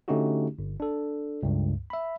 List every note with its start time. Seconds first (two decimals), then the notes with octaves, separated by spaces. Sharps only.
0.08 D3 A3 C#4 D#4 F#4 G4
0.59 G1
0.80 D4 A4
1.43 C#2 G2
1.90 E5 B5